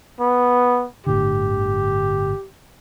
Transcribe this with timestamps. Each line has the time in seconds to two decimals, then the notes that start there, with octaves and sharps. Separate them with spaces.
0.20 B3
1.07 G1 A2 D3 G4